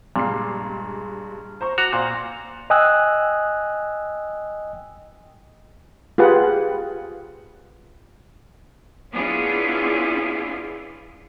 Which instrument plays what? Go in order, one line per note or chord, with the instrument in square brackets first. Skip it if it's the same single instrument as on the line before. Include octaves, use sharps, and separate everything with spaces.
[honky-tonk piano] G2 G#3 C7 [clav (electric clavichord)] A#2
[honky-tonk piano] C5 A#5 C#6
[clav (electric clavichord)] F#4 A#5 [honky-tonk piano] D6
[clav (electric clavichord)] A#2 [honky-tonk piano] C5 F5
[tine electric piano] D#5 G5 G#5 D#6 E6 F#6
[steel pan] F4 G4 G#4 B4 F#5
[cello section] B3 C#4 D4 E4 F4 G#4